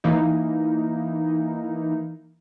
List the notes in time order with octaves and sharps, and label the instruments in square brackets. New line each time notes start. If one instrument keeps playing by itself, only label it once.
[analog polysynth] E3 A#3 D#4